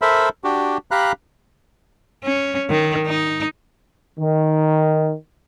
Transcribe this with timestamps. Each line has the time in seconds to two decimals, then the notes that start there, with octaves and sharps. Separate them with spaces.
0.02 A4 A#4 C5 E5 B5
0.44 D4 F#4 G4
0.91 G4 F5 A#5 B5 F#6
2.24 C#4
2.70 D#3
3.07 D#4
4.19 D#3